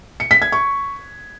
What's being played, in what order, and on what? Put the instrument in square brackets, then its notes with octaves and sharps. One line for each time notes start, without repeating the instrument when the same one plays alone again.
[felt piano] C#7
B6
G#6
C#6